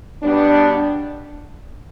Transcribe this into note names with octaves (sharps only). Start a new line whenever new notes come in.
B2 G3 B3 D4